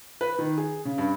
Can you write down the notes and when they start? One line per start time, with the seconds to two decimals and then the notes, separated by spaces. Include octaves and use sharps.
0.21 B4
0.39 D#3
0.57 G#4
0.85 C#3
0.98 G2